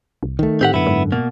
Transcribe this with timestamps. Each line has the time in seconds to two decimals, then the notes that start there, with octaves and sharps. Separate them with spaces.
0.23 C2
0.39 D#3 A3
0.61 A2 C4 G4 F#5
0.74 F#2 D3 B3 E4
0.87 G#2
1.12 B2 A#3